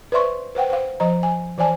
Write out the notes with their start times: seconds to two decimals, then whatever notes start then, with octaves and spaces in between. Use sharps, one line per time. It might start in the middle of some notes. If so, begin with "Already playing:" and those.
0.12 B4 C5 D5 E5 C6 C#6
0.55 B4 C5 F#5 G5
0.70 C5 F5
1.00 F3 C5 D#5 A#5
1.23 G#5
1.58 E3 C5 D5 G#5 A5